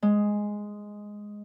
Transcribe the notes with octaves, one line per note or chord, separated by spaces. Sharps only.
G#3